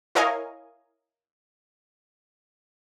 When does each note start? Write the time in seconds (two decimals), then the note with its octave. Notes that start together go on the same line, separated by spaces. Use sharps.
0.15 E4 A#4 C#5 D#5 F5 G#5